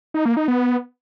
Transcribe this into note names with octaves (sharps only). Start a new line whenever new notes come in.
D#4
A#3
D#4
B3